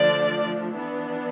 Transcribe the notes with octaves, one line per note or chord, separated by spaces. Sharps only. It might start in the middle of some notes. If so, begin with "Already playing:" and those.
Already playing: D3 F3 A3 D4 D5
E3 B3 D4